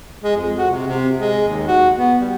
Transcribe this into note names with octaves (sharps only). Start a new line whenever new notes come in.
G#3
F2
F#4
C3
C3
G#3
D#2
F#4
B3
G3